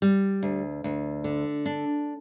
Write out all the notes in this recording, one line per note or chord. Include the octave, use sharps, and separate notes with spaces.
G3
D2
D2
D3
D4